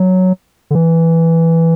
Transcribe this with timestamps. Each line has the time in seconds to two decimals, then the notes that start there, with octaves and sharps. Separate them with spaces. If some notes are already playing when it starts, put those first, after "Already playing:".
Already playing: F#3
0.71 D3
0.75 E3